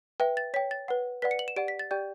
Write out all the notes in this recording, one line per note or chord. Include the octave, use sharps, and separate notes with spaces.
B4 E5 G5
A6
C#5 G5 B6
A6
B4 F#5
B4 D5 F#5 B6
C#7
F#7
E7
G4 D5 F#5 D7
B6
A6
G4 D5 G5 G6